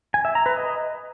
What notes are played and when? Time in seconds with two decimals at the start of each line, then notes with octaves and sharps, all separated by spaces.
0.14 G#5
0.25 E5
0.35 A#5
0.46 B4
0.56 D#5